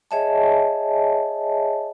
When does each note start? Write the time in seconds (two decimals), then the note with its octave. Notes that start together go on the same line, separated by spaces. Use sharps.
0.11 G#4 C#5 D#5 E5 G#5 A5